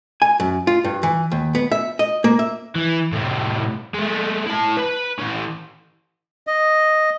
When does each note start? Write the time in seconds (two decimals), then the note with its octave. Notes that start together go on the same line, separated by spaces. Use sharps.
0.22 G#5
0.40 F#2
0.67 F4
0.84 G2
1.03 E3
1.32 D#2
1.55 B3
1.72 E5
1.99 D#5
2.24 A#3
2.39 E5
2.75 E3
3.13 A2 C3
3.94 G#3 A3
4.47 E4 A5
4.77 B4
5.19 E3 C#4
6.47 D#5